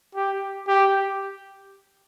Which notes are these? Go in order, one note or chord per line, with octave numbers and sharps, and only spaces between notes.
G4
G4